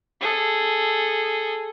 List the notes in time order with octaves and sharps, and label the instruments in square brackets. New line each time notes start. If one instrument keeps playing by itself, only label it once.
[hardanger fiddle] G#4 A4